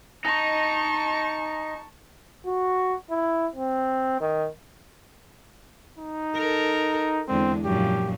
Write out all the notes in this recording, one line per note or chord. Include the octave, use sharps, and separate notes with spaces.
D#4 A5 C#6
F#4
E4
C4
D#3
D#4
A4 A#4
E2 D3 G#3 C4
F#2 A#2 F3 G4